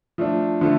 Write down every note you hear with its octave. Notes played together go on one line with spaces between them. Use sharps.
F3 A3 D4
D3 F3 A3